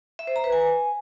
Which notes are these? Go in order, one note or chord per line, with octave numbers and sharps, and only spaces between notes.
E5
C5
A#5
B4
G#5